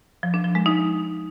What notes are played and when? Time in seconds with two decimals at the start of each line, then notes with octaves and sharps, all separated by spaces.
0.23 F3
0.34 D4
0.44 F3
0.55 G#3
0.66 D#4